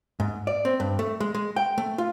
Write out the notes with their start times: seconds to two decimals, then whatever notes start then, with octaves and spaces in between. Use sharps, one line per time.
0.20 G#2
0.47 D5
0.65 C4
0.80 G2
0.99 A3
1.20 G#3
1.35 G#3
1.56 G5
1.78 A3
1.98 F4